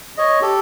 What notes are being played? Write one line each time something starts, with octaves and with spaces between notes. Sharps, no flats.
C#5 D#5
G4 A4